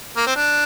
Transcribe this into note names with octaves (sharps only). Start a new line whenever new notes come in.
A#3
C4
D4